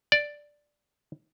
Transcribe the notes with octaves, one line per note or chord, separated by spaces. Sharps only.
D5